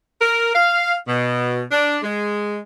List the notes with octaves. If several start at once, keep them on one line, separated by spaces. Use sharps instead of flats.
A#4
F5
B2
D4
G#3